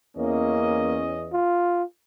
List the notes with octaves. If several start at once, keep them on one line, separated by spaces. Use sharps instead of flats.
E2 A#3 C#4 D#5
F4